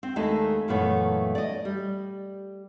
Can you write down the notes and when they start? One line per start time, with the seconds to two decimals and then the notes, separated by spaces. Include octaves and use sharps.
0.03 C4
0.16 D#2 G#3 A3 D#4 D#5 A5
0.68 F#2 A#2 E3 A3 B3 C#5
1.35 D5 D#5
1.65 G3